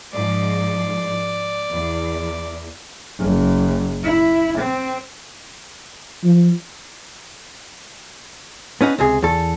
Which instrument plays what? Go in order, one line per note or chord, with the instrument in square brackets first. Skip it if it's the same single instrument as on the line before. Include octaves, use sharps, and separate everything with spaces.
[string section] G#2 F3 [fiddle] D5
[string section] E2
[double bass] F#1
E4
C4
[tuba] F3
[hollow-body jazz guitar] B3 C#4 D#4 F#5
C#2 C3 G#4
E2 A4